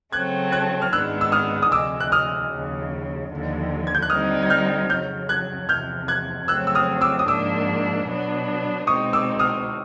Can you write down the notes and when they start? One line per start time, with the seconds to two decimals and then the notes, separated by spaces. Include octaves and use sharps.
0.12 C#3 F#3 A3 C4 F#6 G#6
0.52 F#6 G#6
0.82 F6
0.92 G#2 D#3 G#3 B3 D4 E6 F#6
1.21 E6
1.32 D#6 F6
1.62 D#6
1.72 D2 C3 F3 G#3 D6 E6
2.00 F#6
2.12 D#6 F6
2.51 D#2 C#3 F3
3.31 D#2 D3 F3
3.87 G#6
3.95 G6
4.02 F#6
4.10 D3 G3 C4 D#4 D#6 F6
4.43 G#6
4.50 F6 G6
4.89 F2 C#3 F#3 F6 G6
5.29 F#6 G#6
5.69 E2 C3 F3 F6 G6
6.08 F#6 G#6
6.48 F2 C#3 F#3 A3 C4 E6 F#6
6.67 E6
6.75 D#6 F6
7.01 D6 E6
7.19 D#6
7.28 G#2 F3 A#3 D4 D6 E6
8.07 B2 F#3 B3 D4
8.87 B2 G#3 C4 D#4 C#6 D#6
9.13 D6 E6
9.39 D#6 F6